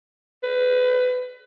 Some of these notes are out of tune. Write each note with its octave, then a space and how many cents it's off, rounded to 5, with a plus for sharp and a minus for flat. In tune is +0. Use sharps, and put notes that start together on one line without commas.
B4 +25